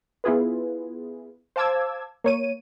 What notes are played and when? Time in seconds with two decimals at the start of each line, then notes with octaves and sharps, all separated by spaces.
0.24 B3 E4 F4 G#4 B4
1.56 C5 F5 A5 D6 E6 G#6
2.24 A#3 C#5 D#7